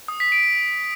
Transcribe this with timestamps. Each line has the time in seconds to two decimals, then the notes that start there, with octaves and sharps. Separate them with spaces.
0.08 D#6
0.20 B6
0.32 D7